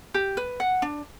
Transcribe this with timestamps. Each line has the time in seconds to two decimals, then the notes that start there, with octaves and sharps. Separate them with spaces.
0.14 G4
0.37 B4
0.60 F#5
0.82 D4